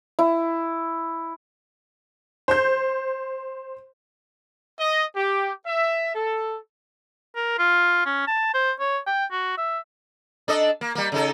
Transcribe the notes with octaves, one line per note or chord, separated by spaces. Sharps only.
E4
C5 G6
D#5
G4
E5
A4
A#4
F4
C#4
A5
C5
C#5
G5
F#4
E5
D4 A4 D#5
A#3
G3 A#3
C#3 D#4 A4